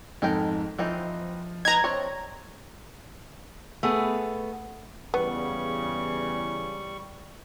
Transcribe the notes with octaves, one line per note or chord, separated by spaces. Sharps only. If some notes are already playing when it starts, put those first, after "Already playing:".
F2 G#2 G#3 A4 A#4 G5
E3 F3 C4 D#4
D#4 B4 A#5 G#6
C4 D4 C#5
A3 B3 G#4
E2 C#3 G3 B3 C#6